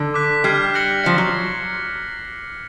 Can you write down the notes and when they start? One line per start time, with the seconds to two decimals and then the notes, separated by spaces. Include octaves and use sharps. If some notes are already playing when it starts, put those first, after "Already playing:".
Already playing: D3
0.14 D6 F#6 B6
0.44 G3 F6 G#6 C7
0.74 F#6 A#6 C#7 F#7
1.03 F3 F#6 A#6 C#7
1.18 F#3